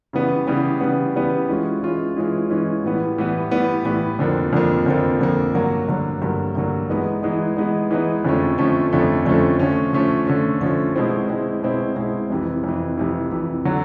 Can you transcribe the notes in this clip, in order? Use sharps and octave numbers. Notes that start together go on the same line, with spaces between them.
C#3 E3 G3 B3
C#3 E3 G3 B3
C#3 E3 G3 B3
C#3 E3 G3 B3
E3 G#3 C#4 F4
E3 G#3 C#4 F4
E3 G#3 C#4 F4
E3 G#3 C#4 F4
A2 E3 G3 B3
A2 E3 G3 B3
A2 E3 G3 B3
A2 E3 G3 B3
F2 D3 F3 A#3
F2 D3 F3 A#3
F2 D3 F3 A#3
F2 D3 F3 A#3
G2 D3 F#3 A#3
G2 D3 F#3 A#3
G2 D3 F#3 A#3
G2 D3 F#3 A#3
E3 G#3 B3 D#4
E3 G#3 B3 D#4
E3 G#3 B3 D#4
E3 G#3 B3 D#4
F2 D3 F3 A3 C#4
F2 D3 F3 A3 C#4
F2 D3 F3 A3 C#4
F2 D3 F3 A3 C#4
D3 F3 A3 C#4
D3 F3 A3 C#4
D3 F3 A3 C#4
D3 F3 A3 C#4
B2 G#3 C4 E4
B2 G#3 C4 E4
B2 G#3 C4 E4
B2 G#3 C4 E4
F2 C3 E3
F2 C3 E3
F2 C3 E3
F2 C3 E3
D3 F#3